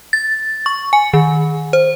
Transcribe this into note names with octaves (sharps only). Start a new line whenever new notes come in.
A6
C#6
G#5
D#3
C5